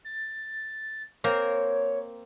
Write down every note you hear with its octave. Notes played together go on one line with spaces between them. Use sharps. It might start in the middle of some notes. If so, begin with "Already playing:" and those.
A6
A#3 C4 A#4 C#5